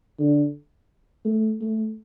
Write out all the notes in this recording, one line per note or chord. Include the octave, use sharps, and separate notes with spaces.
D3
A3
A3